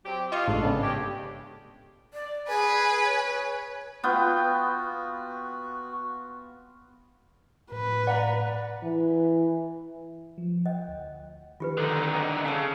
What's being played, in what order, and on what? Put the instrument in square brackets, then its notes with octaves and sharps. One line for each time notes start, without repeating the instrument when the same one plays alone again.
[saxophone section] F#3 C4 G4
[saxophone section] F4 [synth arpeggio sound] D#5 C#6 D#6
[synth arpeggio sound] A1 G#2 [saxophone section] D4 A4
[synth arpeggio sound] C#3 B3
[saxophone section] G#3 A3 G4
[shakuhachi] D5
[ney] G#4 [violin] B4 [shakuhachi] G#5
[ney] C#5
[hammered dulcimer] B3 F4 G5 [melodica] F#4
[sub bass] A2 [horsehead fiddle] B4
[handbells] D5 A#5 [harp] F#5
[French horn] E3
[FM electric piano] F3
[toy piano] D#5 [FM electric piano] F#5 G5
[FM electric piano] D2
[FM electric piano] D#3 [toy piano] F4 G4 B4
[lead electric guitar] D3 D#4 [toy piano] A4
[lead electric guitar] C#3 [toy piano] A5 E6